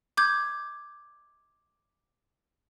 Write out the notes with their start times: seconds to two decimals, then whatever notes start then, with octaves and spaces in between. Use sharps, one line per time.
0.17 D6 G6 G#6